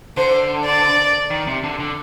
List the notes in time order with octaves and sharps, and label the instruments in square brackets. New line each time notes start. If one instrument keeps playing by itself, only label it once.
[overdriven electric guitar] D3 [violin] C5
[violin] D5
[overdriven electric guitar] D#3
C3
D3
D3